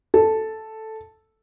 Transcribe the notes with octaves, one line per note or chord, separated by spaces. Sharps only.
A4